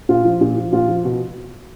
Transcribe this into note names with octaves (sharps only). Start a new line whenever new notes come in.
A#2 F4
F3
A#2
F3
A#2 F4
F3
B2